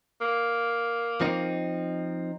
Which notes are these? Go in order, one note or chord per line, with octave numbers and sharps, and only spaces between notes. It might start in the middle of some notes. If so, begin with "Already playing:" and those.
A#3
F3 C4 D#4